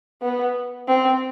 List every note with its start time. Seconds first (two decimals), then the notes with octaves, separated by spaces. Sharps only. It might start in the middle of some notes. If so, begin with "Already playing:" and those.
0.22 B3
0.88 C4